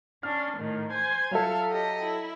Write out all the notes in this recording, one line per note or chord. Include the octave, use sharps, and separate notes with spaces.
C#4 D4 F6
A2 D#3
C5 G#5
F#3 F4 A4 E5 F5
G4 D#5
E4